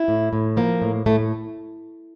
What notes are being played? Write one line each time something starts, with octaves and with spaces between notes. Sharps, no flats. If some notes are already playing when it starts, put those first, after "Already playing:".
Already playing: E4
A2
A2
F3 A#3
A2
A2 A3